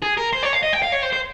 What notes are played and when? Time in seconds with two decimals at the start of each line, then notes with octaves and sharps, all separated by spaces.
0.03 G#4
0.18 A#4
0.33 C5
0.43 C#5
0.53 F5
0.63 D#5
0.73 G5
0.83 F5
0.93 C#5
1.03 C5
1.13 C5